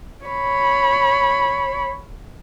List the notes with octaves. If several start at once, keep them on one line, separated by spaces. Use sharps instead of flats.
C#5 B5